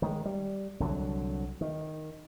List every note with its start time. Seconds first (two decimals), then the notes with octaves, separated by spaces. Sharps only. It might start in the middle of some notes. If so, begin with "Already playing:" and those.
0.02 D#3 G#3
0.26 G3
0.80 C2 D3 F#3
1.61 D#3